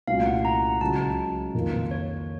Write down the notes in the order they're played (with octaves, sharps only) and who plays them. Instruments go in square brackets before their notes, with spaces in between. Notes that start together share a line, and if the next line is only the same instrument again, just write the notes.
[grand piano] C2 A#2 A3 C#4 F#4 [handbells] F5
[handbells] F#5
A#5
[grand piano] C#2 C#3 F#3 [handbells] A5
[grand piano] F2 D#3 A#3 F4
[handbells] C#5